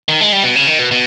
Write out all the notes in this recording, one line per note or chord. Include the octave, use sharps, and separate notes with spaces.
D#3
G#3
G3
B2
C#3
D#3
B2
B2